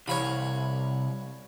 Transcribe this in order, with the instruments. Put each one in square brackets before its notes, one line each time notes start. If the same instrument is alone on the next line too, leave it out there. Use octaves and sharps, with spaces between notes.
[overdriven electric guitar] C2 [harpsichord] C#5 F5 B5